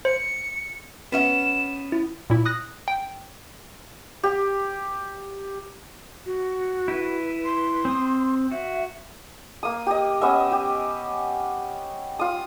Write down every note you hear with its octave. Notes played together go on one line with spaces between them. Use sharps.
C5 C#7
B3 C#4 E5 E7
E4
A#2 E4
D#6 F#6 A#6
G5
G4
F#4
E4 B4
C6
C4 D#6
F#4 E5
A#3 D#6
G4 D#5
B3 C#4 D#5 E5
G4
F4 D#6